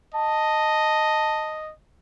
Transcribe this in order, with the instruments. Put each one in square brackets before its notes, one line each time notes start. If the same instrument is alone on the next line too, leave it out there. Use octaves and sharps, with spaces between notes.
[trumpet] D#5 [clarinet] A5